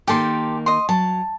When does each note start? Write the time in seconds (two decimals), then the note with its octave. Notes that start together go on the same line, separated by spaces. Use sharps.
0.07 D#3 A#3 D#4 G4 A4 C6
0.66 D#5 C6
0.89 F#3 A5